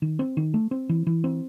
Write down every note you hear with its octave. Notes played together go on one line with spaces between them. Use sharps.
D#3
C4
D#3
A3
C4
E3
E3
C4